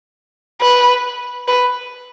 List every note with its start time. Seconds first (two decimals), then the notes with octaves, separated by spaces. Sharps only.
0.62 B4
1.48 B4